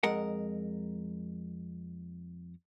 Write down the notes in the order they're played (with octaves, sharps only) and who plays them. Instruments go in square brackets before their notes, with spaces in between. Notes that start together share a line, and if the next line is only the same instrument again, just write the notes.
[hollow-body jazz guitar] F2 G#3 A#4 F#5